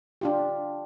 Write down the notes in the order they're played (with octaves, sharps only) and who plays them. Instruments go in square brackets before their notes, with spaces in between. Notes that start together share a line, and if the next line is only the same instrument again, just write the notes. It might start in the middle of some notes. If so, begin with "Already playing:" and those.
[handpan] D4 F4 G4